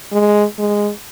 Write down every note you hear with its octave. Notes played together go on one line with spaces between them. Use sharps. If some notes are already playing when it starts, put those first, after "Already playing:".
G#3
G#3